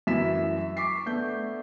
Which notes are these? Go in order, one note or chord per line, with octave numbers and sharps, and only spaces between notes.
F#2 E3 E4 B6 E7
C#6 D6 B6 C7
A3 B3 D4 G6